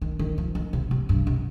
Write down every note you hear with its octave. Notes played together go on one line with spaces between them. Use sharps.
D#3
D#3
F3
D#3
C3
C3
G2
C3